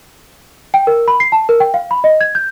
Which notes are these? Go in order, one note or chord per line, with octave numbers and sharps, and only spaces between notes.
G5
A#4
B5
C7
A5
A#4
G5
F5
B5
D#5
G#6
G6